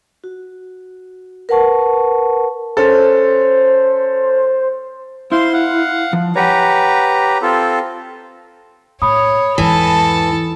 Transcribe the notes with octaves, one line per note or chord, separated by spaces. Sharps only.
F#4
A#4 B4 F#5 A5 C#6
C#4 A4 C5
E4 C5 F5 C6
F5 F#5
F3
G4 B4 C#5 F#5 G#5 A#5
C4 F4 A4
A2 C#5 B5 D#6
E2 G#2 E3 A4 A5